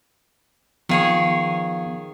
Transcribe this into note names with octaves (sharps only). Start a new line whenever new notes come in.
D#3 F3 B3 G#4 C#5 F5